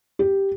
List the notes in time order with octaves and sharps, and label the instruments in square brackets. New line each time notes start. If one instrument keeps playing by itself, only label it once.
[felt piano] G4